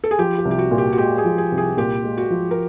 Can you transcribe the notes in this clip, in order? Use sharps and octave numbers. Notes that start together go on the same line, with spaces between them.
A4
G#4
F3 G4
G4
C2
G4
F#4
A#2
G4
F#4
G#3 G4
G#4
F3
G#4
C2
G#4
A#2 G4
G#3
F#4
F3
A#4